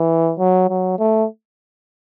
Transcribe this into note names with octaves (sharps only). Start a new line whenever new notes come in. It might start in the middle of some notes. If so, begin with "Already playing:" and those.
Already playing: E3
F#3
F#3
A3